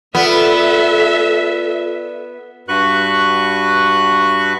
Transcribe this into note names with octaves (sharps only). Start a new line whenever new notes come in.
B3 F4 A4 D5 E5
G2 F#4 B4 C#6 F#6